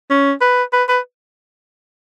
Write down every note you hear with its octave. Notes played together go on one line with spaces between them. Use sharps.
C#4
B4
B4
B4